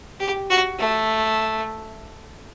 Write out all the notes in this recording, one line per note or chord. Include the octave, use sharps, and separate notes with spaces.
G4
F#4
A3